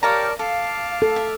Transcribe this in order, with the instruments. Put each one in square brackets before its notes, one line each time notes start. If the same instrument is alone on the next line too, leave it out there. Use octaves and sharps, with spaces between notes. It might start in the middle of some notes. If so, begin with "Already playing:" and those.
[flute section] G4 [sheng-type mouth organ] A#4 D5 A5 [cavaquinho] C#5 F5 A#5
[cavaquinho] A4 [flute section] F5 [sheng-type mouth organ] A5 D6 F6
[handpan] A4
[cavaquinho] E5